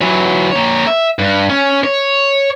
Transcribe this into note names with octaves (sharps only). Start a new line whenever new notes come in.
E3 F#3
A#3 C#5
E5
G2
C#4
C#5